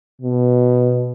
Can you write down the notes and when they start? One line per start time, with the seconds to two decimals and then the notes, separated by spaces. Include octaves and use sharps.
0.21 B2